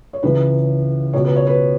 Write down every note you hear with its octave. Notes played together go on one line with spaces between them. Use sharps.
C#5
C#2 C#3 E3 B4
C#2 B2 C#5
B4
C#5
B4